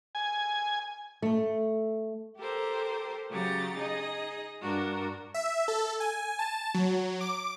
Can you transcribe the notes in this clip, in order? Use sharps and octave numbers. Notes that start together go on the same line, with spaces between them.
G#5
A3
G4 A4 A#4 C5
C#3 F#3 G4 A#5 A6
D#4 G#4 D#5
G2 D4 F#4 A#4
E5
A4
G#5
A5
F#3
D6